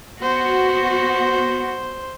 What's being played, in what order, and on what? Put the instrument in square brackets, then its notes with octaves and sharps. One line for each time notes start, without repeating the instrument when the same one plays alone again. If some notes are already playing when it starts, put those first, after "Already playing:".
[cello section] B3 F#4 [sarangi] C5